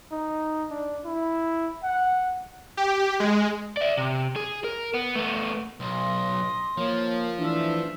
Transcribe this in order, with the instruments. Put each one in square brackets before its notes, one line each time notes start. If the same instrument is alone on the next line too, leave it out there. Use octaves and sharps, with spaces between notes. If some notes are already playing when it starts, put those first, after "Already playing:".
[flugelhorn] D#4
D4
E4
F#5
[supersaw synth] G4
G#3
[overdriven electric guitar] D5 E5
C3
G#4
A#4
B3
A3 B3
[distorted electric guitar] B1 [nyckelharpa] D#5 C6
[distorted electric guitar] F3 [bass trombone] A#3 [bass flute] C#5
[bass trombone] E3 [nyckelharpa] A3 E5 [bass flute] D4